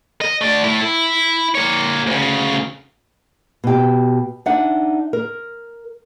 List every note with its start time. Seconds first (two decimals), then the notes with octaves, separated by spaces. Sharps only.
0.21 D#5
0.41 A3 D5
0.64 A3 E4
0.80 E4
1.55 A#3 C#5
2.07 D2 C#3
3.64 B2 G4
4.46 D4 D#4 E5 F#5
5.13 A#4